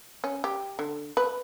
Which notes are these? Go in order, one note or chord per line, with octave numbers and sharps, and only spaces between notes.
C#4
G4
D3
B4